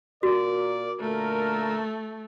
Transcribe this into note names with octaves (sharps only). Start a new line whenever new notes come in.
A#2 F#4 A#4 D5
A#2 D3 A3 A#4